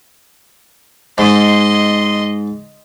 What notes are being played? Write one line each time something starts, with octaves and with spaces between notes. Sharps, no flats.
G#2 D#5 C6